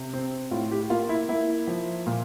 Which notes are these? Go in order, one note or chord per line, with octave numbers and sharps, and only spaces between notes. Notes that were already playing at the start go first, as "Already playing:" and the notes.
Already playing: C3
C4
A2 F4
G4
A#3 F4
E4
A#3 E4
F3
A#2